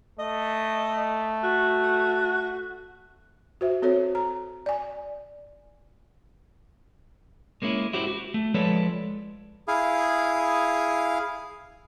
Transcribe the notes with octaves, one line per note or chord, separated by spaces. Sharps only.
A3 D#5
F#4
F#4 C5 E5
C4 F#4 A4 C5 C#5
A#5
D5 G#5
G#3 A#3 C#4 E4
E4 F#4 G4 C5
F#4
A3
F3 G#3 A4 B4 C#5 D5
E4 G#4 F5